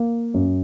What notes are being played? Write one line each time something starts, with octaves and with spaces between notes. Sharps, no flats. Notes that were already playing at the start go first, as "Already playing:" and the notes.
Already playing: A#3
F#2